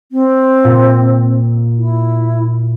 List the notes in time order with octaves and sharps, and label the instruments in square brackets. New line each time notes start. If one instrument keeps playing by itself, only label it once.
[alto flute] C4
[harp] A#2
[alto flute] E4